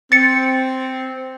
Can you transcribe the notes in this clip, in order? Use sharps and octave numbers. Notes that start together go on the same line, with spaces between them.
C4 A6 C#7